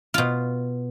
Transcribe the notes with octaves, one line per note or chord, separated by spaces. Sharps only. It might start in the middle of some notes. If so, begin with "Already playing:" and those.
B2 F4